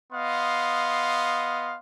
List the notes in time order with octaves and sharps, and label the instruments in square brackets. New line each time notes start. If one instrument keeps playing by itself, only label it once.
[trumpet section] B3 D#5 F5 C6